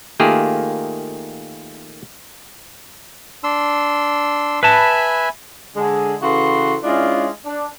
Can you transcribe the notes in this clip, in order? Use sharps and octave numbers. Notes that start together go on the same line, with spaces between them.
D#3 A3 A#3 F4 G4 G#4
D4 C6 E6
B4 E5 G#5 A5 B5
D3 G#3 G#4
C#3 E3 F#4 A4 B4 C6
G#3 C#4 D4 E4 F4
D4